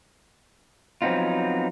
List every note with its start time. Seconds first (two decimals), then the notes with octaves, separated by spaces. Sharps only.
1.02 F3 F#3 B3 C4 D#4 F4